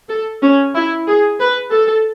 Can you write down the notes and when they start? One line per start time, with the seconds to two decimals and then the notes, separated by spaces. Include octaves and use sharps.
0.09 A4
0.42 C#4
0.75 E4
1.07 G#4
1.40 B4
1.71 A4